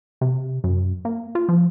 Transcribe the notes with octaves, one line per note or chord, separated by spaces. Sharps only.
C3
F#2
A#3
F4
F3